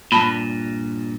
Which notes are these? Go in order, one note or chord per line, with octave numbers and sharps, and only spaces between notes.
G2 A#2 A5 B5